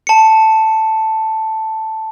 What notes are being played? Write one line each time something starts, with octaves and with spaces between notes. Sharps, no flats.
A5 C#7